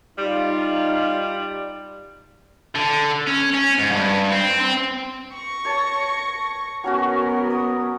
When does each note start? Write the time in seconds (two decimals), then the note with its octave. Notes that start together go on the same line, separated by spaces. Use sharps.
0.18 G3 D#4 F4
2.75 D3
3.27 C#4
3.54 C#4
3.79 G#2
3.91 G2
4.32 C4
4.61 C4
5.34 C#6 A#6
5.65 C#5 A5
6.84 F#3 B3 C#4 F#4 A#4
7.50 D#6